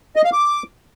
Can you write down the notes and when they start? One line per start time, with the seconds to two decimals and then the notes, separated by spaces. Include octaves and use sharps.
0.16 D#5
0.24 F5
0.33 D6